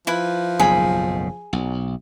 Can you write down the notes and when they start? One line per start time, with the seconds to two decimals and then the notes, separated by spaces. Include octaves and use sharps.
0.07 F3 E4 B4
0.59 F#1 B1 G#2 G#4 B5
1.53 B1